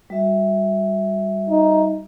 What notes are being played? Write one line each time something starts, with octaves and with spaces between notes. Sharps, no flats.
G3 F#4 E5
D#4